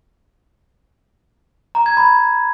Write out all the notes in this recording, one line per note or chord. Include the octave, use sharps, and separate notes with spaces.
A#5
G#6
B5